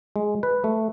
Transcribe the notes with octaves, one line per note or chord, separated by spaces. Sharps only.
G#3
B4
A3